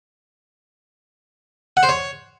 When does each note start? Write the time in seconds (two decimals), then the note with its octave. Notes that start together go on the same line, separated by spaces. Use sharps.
1.77 F#5
1.83 C5
1.89 C#5